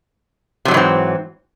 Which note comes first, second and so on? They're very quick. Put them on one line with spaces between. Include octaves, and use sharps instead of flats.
C3 F#3 G#2 E3 C4